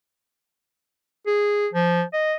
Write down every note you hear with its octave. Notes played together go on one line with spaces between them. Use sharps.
G#4
F3
D#5